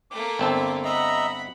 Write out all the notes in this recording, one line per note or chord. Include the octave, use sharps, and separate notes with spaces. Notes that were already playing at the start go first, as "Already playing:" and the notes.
A3 A#3 D6
G1 C4 A4
D#5 E5 F#5 A#5 B5